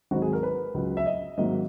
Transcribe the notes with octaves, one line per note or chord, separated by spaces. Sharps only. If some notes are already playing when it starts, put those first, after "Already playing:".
G#1 G#2 F#3 F#4
G#4
A#4
B4
C#2 C#3 F#3
E5
D#5
G#1 G#2 F#3 A#3 D#4 D#5